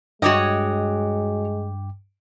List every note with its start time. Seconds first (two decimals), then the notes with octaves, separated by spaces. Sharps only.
0.22 G2 G#3 F#4 C#5 D#5 G5 D6